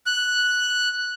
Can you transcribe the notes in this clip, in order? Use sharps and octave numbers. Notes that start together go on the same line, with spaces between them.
F#6